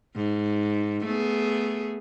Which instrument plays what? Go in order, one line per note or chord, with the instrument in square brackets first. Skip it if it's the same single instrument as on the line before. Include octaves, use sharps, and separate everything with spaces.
[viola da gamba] G#2
A3 B3 G#4